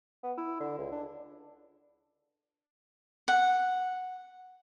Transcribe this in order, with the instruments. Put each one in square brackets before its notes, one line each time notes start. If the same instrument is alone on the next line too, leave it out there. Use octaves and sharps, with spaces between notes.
[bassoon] B3
E4
D3
C#2
D4
[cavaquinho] F#5